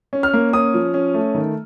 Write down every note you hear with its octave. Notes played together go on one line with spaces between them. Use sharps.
C#4
F6
A#3
C#4 D#6
F3
C#4
A3
D#3